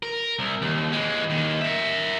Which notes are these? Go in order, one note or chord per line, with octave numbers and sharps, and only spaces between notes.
A#4
C2
D#2
E3 G#3
D#2 D#3
A#4 E5